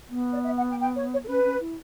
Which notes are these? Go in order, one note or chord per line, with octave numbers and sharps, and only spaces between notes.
B3
D5
E5
F#5
G5
G5
C#5
C#5
A4
C#4 B4
C#4
E4